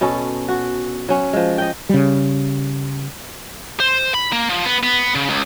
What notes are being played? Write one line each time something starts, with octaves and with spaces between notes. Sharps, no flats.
B2 C#4 A4
F#4
F#3 C#4
F3 G#3
D#5 G5
C#3 G3
C5
B5
A#3
F3
B3
B3
C#3
C#2